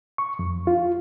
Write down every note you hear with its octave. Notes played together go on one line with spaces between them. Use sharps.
C#6
F2
F4